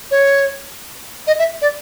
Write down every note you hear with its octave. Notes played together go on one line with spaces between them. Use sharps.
C#5
D#5
E5
D5